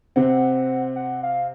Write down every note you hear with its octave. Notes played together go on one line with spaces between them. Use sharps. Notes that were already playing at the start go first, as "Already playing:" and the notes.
C3 C4 F#5
F#5
F5